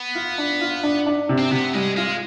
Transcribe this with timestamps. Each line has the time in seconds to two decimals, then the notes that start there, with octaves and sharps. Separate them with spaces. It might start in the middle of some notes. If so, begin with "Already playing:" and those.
Already playing: B3
0.15 F4
0.38 D4
0.61 F4
0.83 D4
1.06 D4
1.29 C3
1.38 C4
1.52 C3 B3
1.74 G3 G#3
1.97 G#3 F4